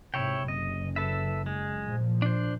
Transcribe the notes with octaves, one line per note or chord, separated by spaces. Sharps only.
G#2 C3 E4 C#5 G5
F#1 D#5
A4 B4 E5
G#3
A#2 F3
D4 C5